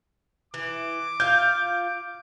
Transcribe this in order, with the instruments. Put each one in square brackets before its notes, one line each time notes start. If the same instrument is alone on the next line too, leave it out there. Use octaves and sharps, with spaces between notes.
[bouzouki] E3 [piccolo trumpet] D6
[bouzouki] F4 F5 [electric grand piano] G6